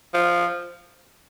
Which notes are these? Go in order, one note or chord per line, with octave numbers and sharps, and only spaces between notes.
F3